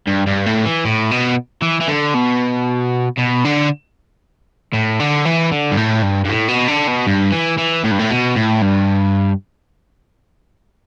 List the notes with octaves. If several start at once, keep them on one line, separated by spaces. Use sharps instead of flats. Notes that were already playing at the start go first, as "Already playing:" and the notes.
G2
G2
A2
E3
A2
B2
E3
E3
D3
B2
B2
D3
A2
D3
E3
D3
G2
A2
G2
G2
A2
B2
D3
B2
G2
E3
E3
A2
G2
A2
B2
A2
G2